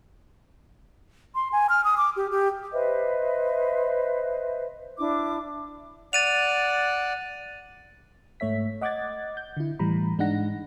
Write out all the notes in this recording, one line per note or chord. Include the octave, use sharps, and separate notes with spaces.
C6
G#5
F6
D#6
D6
G4
G4
B4 C5 D#5 E5
D4 E4 D6
D5 F#5 A6 D#7 F7
G#2 A3 C#5 E5 B6
D#5 F#5 D6 F#6 G#6 A6
G6
D3 E4
A2 E3 G3 A#5 B5
G#2 G#3 D4 D#4 F#5 A#6